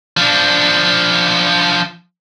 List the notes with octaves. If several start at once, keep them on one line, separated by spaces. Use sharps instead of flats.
F3 D4